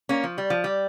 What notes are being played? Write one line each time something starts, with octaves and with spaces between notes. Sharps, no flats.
A#3 C#4
F3
G3
F3
G3